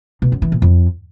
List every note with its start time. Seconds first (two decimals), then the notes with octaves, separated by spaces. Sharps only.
0.22 B2
0.32 F#2
0.42 E3
0.52 A#2
0.62 F2